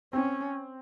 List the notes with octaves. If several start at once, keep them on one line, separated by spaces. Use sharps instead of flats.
C4 C#4